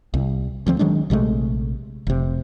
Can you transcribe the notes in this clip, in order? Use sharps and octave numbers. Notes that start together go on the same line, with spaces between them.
C2
D2 F3 C4
D#3 F#3 G#3 D4
A#1 C3 G#3 A3
F1 C3